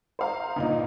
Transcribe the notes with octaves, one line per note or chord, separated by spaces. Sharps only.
C5 F5 A#5
G1 A#2 D#4